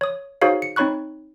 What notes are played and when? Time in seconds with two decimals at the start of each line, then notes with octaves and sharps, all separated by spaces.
0.01 C#5 D#6
0.42 D#4 F#4 G#4 C5 C#5 F5
0.62 C#7
0.76 C4 D#4 C#5 B5 C#6 F#6